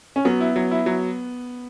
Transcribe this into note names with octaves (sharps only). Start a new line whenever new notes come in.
C#4
F#3 B3
E4
F#3
E4
F#3